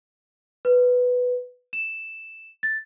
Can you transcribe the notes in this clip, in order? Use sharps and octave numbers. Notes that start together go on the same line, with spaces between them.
B4
E7
A6